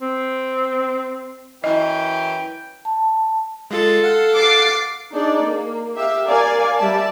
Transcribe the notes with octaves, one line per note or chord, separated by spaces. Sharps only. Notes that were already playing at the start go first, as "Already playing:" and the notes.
C4
F#2 E3 D#5 G5
A5
G#3 F4 A4 A6
F5 F#5
D6 A6 C7
D4 D#4 G#4 D5
A#3
G4 E5 F5
A#4 D5 F5 G#5
G3 D5 E5 A5